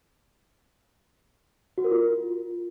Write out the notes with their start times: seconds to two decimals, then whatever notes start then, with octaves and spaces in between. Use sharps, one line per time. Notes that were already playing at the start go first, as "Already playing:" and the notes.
1.78 F#4
1.84 A#4
1.91 F4